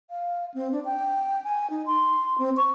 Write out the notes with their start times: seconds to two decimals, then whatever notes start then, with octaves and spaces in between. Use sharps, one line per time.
0.10 F5
0.54 C4
0.72 D4
0.85 G5
1.44 G#5
1.70 D#4
1.86 C6
2.38 C4
2.57 C#6